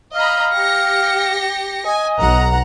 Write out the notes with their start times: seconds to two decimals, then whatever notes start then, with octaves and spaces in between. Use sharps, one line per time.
0.15 D#5 F5 A#5 B5
0.53 G4 A#6 C#7
1.85 D#5 G#5
2.18 B1 F#5 A#5